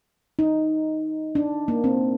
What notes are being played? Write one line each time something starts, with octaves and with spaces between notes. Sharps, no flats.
D#4
D4
A#3
C4